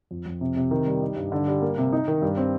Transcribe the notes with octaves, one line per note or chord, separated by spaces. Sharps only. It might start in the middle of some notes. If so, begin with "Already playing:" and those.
F2
F2
C3
C3
D#3
G3
D#4
G2
D3
G3
A#3
C3
D#4
D#3
G2
C4